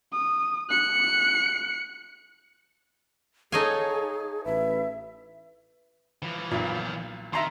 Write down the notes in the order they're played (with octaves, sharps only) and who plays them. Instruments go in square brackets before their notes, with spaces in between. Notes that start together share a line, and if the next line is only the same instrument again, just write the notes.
[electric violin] D#6
F#6 C#7
[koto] D#4 D#5 G#5 [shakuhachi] G#4 [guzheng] A4 C#5 F5
[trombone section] A1 B4 [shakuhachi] E5
[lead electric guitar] E3 F3
[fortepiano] B1 A#2
[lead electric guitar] D#3 [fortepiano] E5 A#5 C6